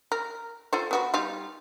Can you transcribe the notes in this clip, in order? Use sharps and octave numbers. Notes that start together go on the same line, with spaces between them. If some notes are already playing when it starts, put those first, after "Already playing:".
A#4
F4 A4 C5
B3 F#4 B4
G3 D#4 F4